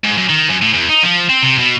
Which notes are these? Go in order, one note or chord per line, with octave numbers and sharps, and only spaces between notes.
G#2
F#2
D#3
F#2
A2
E2
D#4
F3
C4
C3
B2